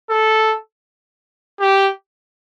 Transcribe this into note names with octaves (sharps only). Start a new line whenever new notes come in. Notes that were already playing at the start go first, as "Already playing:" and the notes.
A4
G4